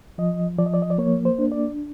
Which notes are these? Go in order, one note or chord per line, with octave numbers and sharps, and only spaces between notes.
F3 D#5
F3 D5
D#5
D5
D#5
D5
A#3 C#5
C5
D4
D5